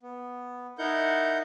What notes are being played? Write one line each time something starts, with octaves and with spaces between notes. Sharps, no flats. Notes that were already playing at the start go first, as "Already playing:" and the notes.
B3
D#4 E4 A#4 F#5 G6